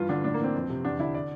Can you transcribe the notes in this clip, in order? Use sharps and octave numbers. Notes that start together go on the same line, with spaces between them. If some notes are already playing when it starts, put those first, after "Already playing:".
Already playing: G2 E3 F4
D3 D4
A2 D4
A#3
E3 C4
F2
C3
E2 D4
D3 E4
D5